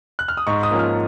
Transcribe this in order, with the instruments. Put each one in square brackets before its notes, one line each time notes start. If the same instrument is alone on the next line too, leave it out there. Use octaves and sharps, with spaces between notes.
[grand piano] F#6
F6
D#6
G#2 C#6
D#6
F3 A#3 C#4
F6